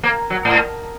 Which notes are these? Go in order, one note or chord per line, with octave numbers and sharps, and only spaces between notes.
A#3
F#3
A2